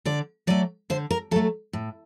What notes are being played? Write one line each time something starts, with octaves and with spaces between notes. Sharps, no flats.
D3 D5
F#3 A3 D5
D3 C5
A#4
F#3 A3 A4
A2